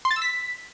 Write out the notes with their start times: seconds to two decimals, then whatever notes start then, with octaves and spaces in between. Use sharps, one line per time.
0.05 C6
0.11 A6
0.16 E6
0.22 B6